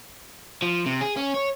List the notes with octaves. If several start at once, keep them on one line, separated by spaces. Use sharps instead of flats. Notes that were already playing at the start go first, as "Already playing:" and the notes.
F3
C3
G#4
C#4
C#5